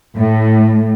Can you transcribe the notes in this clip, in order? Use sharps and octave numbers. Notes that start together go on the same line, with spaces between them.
A2